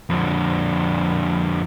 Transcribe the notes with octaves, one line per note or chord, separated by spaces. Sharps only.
F2 D3